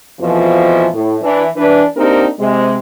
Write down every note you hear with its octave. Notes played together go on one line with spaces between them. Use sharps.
F2 B2 E3 F3
A2
E3 D4
E3 D4 B4
A#3 C4 D4 D#4 G4 A#4
C3 G#3